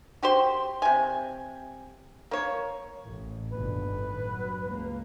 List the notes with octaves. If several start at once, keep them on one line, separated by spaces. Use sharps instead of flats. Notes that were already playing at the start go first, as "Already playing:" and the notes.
F#4 G4 C5 C6
C3 G#5
A#3 C#5
A1
G1 D#2 B2 B4
A2 D#3
G2 F#3
C#2 A#3